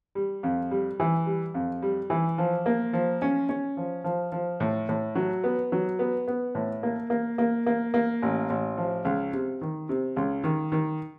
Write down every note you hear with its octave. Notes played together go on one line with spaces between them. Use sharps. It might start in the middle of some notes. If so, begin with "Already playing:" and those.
G3
F2
G3
E3
G3
F2
G3
E3
F3
A#3
F3
C#4
C#4
F3
F3
F3
A2
A2
F#3
B3
F#3
B3
B3
A2
A#3
A#3
A#3
A#3
A#3
A1
A1
F3
C#2
C3
D#3
C3
C#2
D#3
D#3